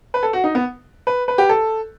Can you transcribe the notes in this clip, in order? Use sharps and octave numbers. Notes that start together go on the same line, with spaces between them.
B4
A4
F#4
D#4
B3
B4
B4
G4
A4